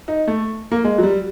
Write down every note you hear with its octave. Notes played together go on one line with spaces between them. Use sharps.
D#4
A3
A#3
G#3
F#3
G3